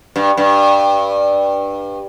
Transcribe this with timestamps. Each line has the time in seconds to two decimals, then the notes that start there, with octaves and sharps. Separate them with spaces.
0.16 G2
0.37 G2